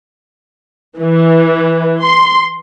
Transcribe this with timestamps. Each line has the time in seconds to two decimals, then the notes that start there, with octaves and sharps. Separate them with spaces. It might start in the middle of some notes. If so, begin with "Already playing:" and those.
1.00 E3
2.03 C6